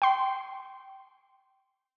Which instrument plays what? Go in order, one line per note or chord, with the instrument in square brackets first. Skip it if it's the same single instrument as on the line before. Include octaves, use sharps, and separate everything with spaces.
[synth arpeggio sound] G5 C6